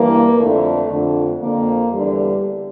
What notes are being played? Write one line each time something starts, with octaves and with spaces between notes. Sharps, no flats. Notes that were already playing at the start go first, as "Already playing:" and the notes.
Already playing: G2 E3 A#3
F2 D3 A3
F2 D3
F2 D3 A#3
E2 D3 G3